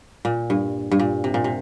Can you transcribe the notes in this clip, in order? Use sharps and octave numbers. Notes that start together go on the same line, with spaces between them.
A#2
G2
G2
A#2
C3
A#2
C3